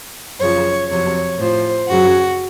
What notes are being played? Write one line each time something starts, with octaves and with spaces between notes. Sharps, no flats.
F#2 C#3 F3 C#5
F2 C3 F#3 C#5
A2 F3 C5
F#2 C#3 F#3 F#4